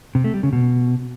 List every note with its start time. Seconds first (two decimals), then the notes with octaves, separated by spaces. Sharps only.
0.15 C3
0.24 A3
0.34 G3
0.43 C#3
0.53 B2